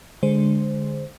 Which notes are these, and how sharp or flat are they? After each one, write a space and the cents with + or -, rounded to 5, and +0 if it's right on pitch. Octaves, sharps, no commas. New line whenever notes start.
D3 +0 G#3 +0 C5 +0